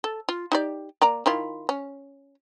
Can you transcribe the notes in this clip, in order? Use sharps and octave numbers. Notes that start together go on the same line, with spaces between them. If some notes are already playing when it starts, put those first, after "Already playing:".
A4
F4
D#4 G4 D5
A#3 D5 A#5
D#3 E4 F4
C#4